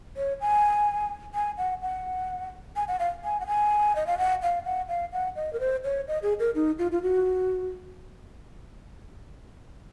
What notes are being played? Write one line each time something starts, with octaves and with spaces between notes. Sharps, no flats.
C#5
G#5
G#5
F#5
F#5
G#5
F#5
F5
G#5
F#5
G#5
D#5
F5
F#5
F5
F#5
F5
F#5
D#5
A#4
C5
C#5
D#5
G#4
A#4
D#4
F4
F4
F#4